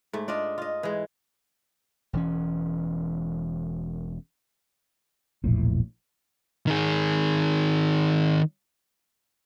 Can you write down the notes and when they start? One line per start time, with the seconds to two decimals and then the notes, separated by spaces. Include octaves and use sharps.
0.13 G#2 A3
0.28 D4 F4 D5 D#5
0.58 F4 D#5
0.83 E3 G#3
2.13 E1 E3 C#4
5.44 E1 A#1 A2
6.67 D#3 G#4